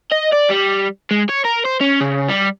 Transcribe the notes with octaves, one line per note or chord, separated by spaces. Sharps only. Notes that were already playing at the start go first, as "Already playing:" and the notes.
D#5
D5
G3
G#3
C#5
A#4
C5
C#4
C#3
G3